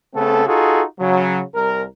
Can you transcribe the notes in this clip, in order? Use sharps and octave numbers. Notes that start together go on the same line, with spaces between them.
C#3 A3 B3 C4 A4
D#4 F4 F#4 G#4 A4
C#3 F#3
C2 A#4